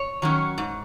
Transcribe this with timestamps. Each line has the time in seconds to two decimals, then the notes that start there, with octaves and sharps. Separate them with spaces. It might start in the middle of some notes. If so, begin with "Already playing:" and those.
Already playing: C#5
0.22 D#3 F#3 C#4
0.58 G#2